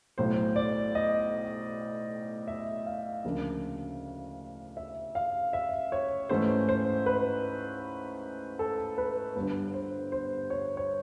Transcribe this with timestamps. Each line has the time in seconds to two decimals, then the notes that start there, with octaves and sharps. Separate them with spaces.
0.18 B1 A2 F#3 C5
0.56 D5
0.95 D#5
2.48 E5
2.86 F5
3.25 D2 C#3 F3 A#3 D4
4.77 E5
5.15 F5
5.53 E5
5.92 C#5
6.29 G#2 E3 A3 C#4 C5
6.69 C5
7.06 B4
8.59 A4
8.98 B4
9.36 G1 G2 D3 B4
9.74 C5
10.12 C5
10.50 C#5
10.77 C#5